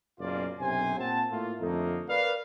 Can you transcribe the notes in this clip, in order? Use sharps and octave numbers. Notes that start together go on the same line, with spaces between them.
F#1 F#2 B2 A#3 F4 D5
B1 F#2 C3 C5 G#5
A#2 C4 F#5 A5
A2 A3 A#3 F4
F2 D3 A3 A#3 D#4
A#4 B4 D5 F5